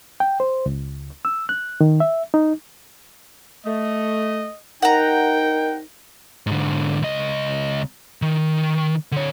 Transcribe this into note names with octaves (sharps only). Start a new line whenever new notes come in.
G5
C5
C#2
E6
F#6
D#3
E5
D#4
A3 D#5
C2 D#4 A#4 D#5 F#5 G5 A#5
G#2 D3
C#2 D#5
D#3
D3 C#5